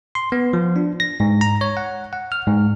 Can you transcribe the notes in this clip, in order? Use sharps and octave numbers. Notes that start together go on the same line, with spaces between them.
C6
B3
F3
D4
A#6
G#2
A#5
C#5
F#5
F#5
F6
G#2